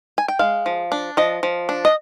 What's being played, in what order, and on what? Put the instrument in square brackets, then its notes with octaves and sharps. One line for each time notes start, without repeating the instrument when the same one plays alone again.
[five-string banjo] G#5
G5
G#3 F5
F3
D4
F3 D#5
F3
D4
D#5